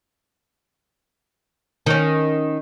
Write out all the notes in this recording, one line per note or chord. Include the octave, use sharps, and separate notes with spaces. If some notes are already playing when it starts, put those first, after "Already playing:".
D#3 C#4